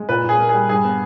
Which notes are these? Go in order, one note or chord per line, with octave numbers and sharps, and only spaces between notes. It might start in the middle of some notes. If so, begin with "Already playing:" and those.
Already playing: G#3
A#2 B4
A#2 G#4
A#3
G3 G#4
G2 G#4
B3